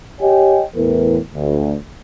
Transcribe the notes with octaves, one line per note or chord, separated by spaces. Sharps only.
G4 C#5 D#5 G5 G#5
E2 A2 E3 A#4 B4
D2